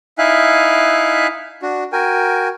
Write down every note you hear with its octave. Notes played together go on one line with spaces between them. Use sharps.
D#4 E4 E5 F5 G#5 F#6
D4 F#4
F#4 A#4 G5 G#5